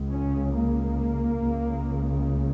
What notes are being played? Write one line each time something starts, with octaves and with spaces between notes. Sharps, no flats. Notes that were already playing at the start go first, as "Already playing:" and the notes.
Already playing: C#2 C#3
C#4
A#3
C#2 C#3